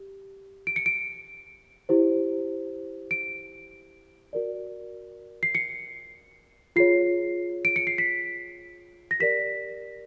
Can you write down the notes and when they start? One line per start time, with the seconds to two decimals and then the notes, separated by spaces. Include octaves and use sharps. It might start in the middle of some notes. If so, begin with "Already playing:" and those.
Already playing: G4
0.67 D7
0.76 C#7
0.86 D7
1.89 E4 G4 C5
3.11 D7
4.33 F#4 A#4 D5
5.43 C7
5.55 C#7
6.76 F4 G#4 C#5 C7
7.65 D7
7.76 C#7
7.87 C7
7.98 B6
9.11 A#6
9.20 G4 A#4 D5 B6